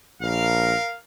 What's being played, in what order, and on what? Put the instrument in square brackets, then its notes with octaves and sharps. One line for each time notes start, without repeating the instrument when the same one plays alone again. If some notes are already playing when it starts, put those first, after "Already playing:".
[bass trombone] A#1 [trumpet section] A#4 F5